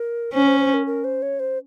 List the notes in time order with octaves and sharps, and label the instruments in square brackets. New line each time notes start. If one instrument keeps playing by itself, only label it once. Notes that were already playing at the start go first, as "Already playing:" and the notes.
Already playing: [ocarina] A#4
[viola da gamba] C#4 [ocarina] C5
[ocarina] C5
C5
A#4
A#4
C5
C#5
C5